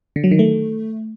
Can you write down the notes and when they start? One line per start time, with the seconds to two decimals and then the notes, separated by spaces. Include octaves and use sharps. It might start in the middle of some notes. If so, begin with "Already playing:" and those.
0.16 D3
0.24 F#3
0.31 D#3
0.39 A3